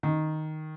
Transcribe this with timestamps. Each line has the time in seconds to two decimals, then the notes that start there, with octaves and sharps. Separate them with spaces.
0.03 D#3